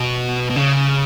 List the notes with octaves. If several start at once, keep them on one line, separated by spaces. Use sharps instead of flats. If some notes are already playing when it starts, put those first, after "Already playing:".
Already playing: B2
B2
C#3